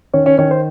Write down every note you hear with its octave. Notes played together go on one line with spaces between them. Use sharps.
D#3 C#4 C#5
C#4 C#5
D#3 C#4 C#5
C5